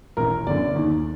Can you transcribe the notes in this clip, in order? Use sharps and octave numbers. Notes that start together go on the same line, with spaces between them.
A1 A2 A#4
G1 F#2 D3 D5
D#2 D#3